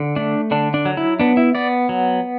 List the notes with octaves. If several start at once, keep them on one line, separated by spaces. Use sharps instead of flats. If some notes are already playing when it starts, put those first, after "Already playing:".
Already playing: D3
A3 D4
D3 D4
D4
F#3
E4
B3 D4
E4
B3 D5
F#3